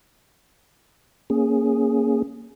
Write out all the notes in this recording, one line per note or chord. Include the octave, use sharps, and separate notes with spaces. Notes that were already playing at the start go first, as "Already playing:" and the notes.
A#3 C#4 G#4